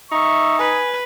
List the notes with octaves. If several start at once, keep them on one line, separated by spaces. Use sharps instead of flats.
D#4 E5 C#6
B4 G#5